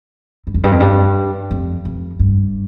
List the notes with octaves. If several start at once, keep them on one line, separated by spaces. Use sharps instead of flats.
G2
F2
G2
F2
G2
F2
F2
G2